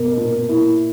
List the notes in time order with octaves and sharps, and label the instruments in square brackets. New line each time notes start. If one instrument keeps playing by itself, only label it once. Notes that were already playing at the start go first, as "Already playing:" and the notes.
Already playing: [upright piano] B2 [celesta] A#4
[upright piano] A#2
E4